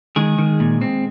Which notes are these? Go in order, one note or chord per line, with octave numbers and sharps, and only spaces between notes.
D#3 G#3 G#4
D#3
A#2
C4